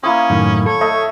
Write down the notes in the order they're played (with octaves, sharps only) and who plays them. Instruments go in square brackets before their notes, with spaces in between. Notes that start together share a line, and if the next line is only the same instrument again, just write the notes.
[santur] A#3 E4 D#6 [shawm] C#4
[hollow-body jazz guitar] F#2 A2 D#3
[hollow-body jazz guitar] A4 [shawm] C#5
[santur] A3 D#5 E5